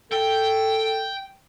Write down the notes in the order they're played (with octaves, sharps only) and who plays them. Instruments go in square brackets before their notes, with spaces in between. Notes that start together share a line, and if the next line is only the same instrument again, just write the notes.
[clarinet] A4 [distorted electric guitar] G5